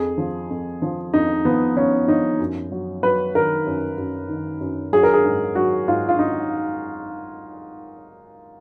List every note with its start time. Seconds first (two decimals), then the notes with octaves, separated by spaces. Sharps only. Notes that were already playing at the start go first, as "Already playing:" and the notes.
Already playing: F2 G#4
0.18 F3
0.50 F2
0.82 F3
1.14 F2 D#4
1.45 F3 B3
1.76 F3 C#4
2.08 F3 D#4
2.39 F#2
2.72 F#3
3.03 F#3 B4
3.35 D#3 A#4
3.67 F#2
3.98 F#2
4.29 D#3
4.61 F#2
4.93 F#3 G#4
5.03 A#4
5.14 G#4
5.25 G#2
5.55 F#3 F#4
5.88 G#2 F4
6.09 F4
6.19 D#4